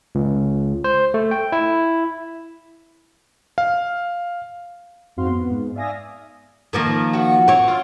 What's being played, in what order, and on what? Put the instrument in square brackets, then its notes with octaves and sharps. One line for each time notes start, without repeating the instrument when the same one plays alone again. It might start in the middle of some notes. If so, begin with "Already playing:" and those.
[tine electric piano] C#2
C5
A3
G5
E4
[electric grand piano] F5
[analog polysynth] F2 G#2 C4 F#4 F5 C6
B3
G#2
D5 E5 F5 G#5 D#6 A#6
[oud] D#3 F3 A#3
[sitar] F#4
[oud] C4 C#5
[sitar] F4